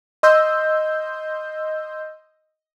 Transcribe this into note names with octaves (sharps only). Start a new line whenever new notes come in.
D#5 C6 E6 G6